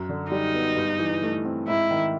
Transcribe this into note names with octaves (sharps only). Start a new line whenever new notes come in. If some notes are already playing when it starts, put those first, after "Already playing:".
Already playing: F#2
D3
G3 D#4
B3
G2
E3
A3
C4
G#2 E4
D#3